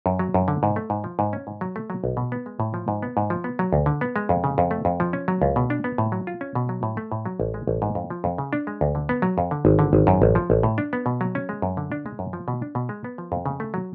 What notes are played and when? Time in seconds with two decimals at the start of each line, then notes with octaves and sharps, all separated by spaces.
0.06 F#2
0.19 F#3
0.34 F#2
0.48 D3
0.63 G#2
0.76 A3
0.90 G#2
1.04 F3
1.19 G#2
1.33 C#4
1.47 G#2
1.61 F#3
1.76 A3
1.90 F#3
2.04 B1
2.17 B2
2.32 B3
2.46 G#3
2.60 A2
2.74 F3
2.88 G#2
3.03 B3
3.17 G#2
3.30 F3
3.44 B3
3.59 F#3
3.73 D2
3.86 D3
4.01 B3
4.16 G#3
4.29 F2
4.44 C#3
4.58 F2
4.71 A3
4.85 F2
5.00 F3
5.13 C#4
5.28 F#3
5.42 C#2
5.56 B2
5.70 D4
5.84 B3
5.98 A2
6.12 F#3
6.27 F4
6.41 C#4
6.55 B2
6.69 F#3
6.83 A2
6.97 A3
7.12 A2
7.26 F#3
7.40 A1
7.54 G#3
7.67 A1
7.82 G#2
7.95 F2
8.10 F3
8.24 F2
8.38 C#3
8.53 D4
8.67 G#3
8.81 D2
8.95 D3
9.09 B3
9.22 F#3
9.38 F2
9.51 D3
9.65 G#1
9.79 D3
9.93 G#1
10.07 F#2
10.22 A1
10.35 F3
10.50 A1
10.63 A2
10.78 D4
10.93 B3
11.06 B2
11.21 F#3
11.35 C#4
11.49 G#3
11.62 F#2
11.77 D3
11.92 D4
12.06 G#3
12.19 F#2
12.33 F3
12.48 B2
12.62 D4
12.75 B2
12.89 G#3
13.04 B3
13.18 F3
13.32 F2
13.46 C#3
13.60 A3
13.74 F#3